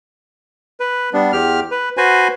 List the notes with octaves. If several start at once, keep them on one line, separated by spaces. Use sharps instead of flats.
B4
G3 B3 D4
E2 G4 F6
B4
F#4 B4 C5 G#5